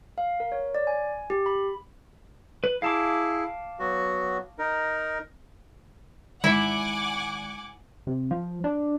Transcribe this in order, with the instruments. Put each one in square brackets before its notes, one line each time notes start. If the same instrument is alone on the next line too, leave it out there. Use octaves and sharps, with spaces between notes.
[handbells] F5
A#4
C#5
D5
G#5
G4
B5
[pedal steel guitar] B4
[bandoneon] E4 G#4 [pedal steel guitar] F5 A5 D6
[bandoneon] F#3 B3 F#4
D#4 A#4
[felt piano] G#1 [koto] E4 E5 [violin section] F#5 G#5 D6
[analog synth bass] C3
F3
D4